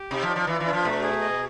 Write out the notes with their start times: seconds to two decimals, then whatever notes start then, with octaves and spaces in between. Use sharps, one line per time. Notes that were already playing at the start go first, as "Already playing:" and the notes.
Already playing: G4
0.11 C3 D#4
0.23 F3
0.29 D5
0.36 F3
0.47 E3 F4
0.60 E3
0.66 D4
0.73 F3
0.85 B2 A3
1.03 G#4
1.21 D#5